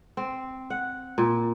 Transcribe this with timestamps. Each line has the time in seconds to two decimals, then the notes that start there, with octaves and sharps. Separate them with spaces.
0.17 C4
0.70 F#5
1.18 A#2